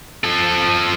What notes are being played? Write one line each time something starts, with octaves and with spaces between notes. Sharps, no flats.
F3 A4